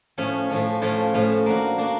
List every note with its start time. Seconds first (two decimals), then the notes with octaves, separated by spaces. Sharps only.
0.18 A2 F3 A3 C#4
0.50 A2 F3 A3 C#4
0.82 A2 F3 A3 C#4
1.14 A2 F3 A3 C#4
1.46 A#3 D4 F#4
1.78 A#3 D4 F#4